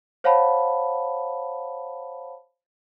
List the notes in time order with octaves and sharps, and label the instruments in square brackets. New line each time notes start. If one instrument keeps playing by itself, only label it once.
[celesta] C5 C#5 F5 F#5 A5 B5